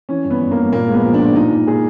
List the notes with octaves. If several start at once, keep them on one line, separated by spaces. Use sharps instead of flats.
E3 C#4
G2
B3
G2
A#3
G2
A#2 A#3
G#3
B3
F3
D4
A#2
A#2 D#4
A#2
A#2 G#4